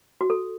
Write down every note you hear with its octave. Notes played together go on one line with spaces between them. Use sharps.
F#4
A4